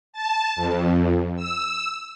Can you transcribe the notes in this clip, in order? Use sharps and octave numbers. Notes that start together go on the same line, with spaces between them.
A5
F2
E6